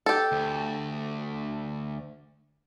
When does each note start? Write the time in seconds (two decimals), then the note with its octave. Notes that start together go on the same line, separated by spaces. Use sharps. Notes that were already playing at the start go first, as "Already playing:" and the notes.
0.06 G4 A4
0.32 D2